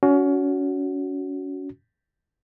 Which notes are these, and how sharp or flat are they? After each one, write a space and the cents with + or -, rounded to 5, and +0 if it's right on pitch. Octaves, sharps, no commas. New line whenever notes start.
C#4 +30 F#4 +0